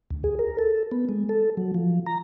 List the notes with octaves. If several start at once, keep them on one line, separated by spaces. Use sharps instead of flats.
D2
G#4
A#4
A4
B3
G#3
A4
F#3
F3
A#5